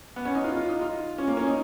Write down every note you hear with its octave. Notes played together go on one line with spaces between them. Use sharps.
B3
C#4
D#4
F4
F4
D#4
F4
C#4
A#3
C#4
D#4